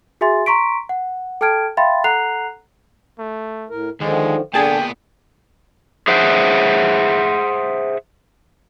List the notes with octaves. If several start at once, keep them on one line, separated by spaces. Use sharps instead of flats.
F#4 G#4 E5 G#5 C6 A6
A#5 C6 C#6 B6 D7
F#5
A4 G5 A5 F6 G#6 D7
E5 F5 G5 B5 C6 A6
A4 F#5 A#5 F#6 C7 F7
A3
A2 A#4
D#2 D3 D#3 F3 G#3
A#2 D3 B3 D4 G#4 G5 A5
G#4 C5 E5 F#5